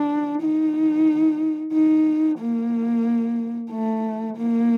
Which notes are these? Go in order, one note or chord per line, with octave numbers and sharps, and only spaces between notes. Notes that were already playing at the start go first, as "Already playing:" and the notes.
Already playing: D4
D#4
D#4
A#3
A3
A#3